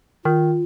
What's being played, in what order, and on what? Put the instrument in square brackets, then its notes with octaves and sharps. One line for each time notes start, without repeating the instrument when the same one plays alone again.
[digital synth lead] D#3 [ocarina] F4